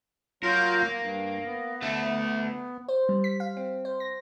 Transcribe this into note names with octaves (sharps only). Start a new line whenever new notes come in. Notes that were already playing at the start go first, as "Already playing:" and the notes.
F#3 A#3 F4 A#4 G6
G2
B3
D2 A3
C5
G3
B6
F5
C4
C5
A#6